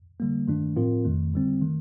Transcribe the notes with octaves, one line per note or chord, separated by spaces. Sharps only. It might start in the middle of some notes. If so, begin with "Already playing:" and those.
D3 G3 A#3
G2 D#3 A3 D4
A2 F3 C4 F4 A#4
F2 D#3 A3
D3 G3 C4
D#3 A3